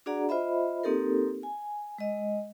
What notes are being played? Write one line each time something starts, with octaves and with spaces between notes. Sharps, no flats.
D4 F#4 G#4 D5 F#5 A#5
F4 C5 D#5 E5 B5
A#3 C4 D#4 G4 A4 A#4
G#5
G#3 D#5